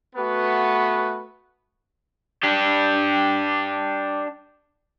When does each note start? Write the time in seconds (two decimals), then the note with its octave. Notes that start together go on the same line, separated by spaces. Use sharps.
0.16 A3 B3 F#4 B4
2.44 D4 G4